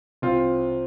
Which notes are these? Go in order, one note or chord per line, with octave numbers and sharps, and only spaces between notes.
C2 C4 F4